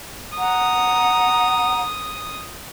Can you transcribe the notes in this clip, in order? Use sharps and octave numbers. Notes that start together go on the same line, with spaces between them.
F#5 A#5 D#6